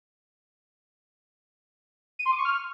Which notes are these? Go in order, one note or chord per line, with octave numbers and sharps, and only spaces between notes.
D#7
C6
D6
C#6
F6